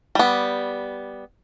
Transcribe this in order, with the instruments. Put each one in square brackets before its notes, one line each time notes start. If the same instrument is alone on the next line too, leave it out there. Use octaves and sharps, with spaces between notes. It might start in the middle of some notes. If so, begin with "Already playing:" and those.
[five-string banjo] G3 B3